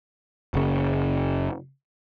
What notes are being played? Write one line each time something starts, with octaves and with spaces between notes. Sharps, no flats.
F#1 C#3